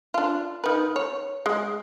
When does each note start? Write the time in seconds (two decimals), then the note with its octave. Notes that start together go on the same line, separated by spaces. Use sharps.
0.14 D4 F4
0.64 D#3 B4
0.96 C#5
1.46 G#3